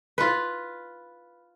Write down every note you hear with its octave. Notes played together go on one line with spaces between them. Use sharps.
F4 B4